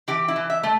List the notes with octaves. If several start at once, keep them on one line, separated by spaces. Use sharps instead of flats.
E3 G4
E4
E3
E5
A3